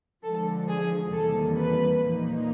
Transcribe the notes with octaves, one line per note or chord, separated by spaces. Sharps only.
D3 F3 G#3 A4
G#4
E2 C3 D#3 G3 A#3 A4
B4
A#2 F3 A#3 D#4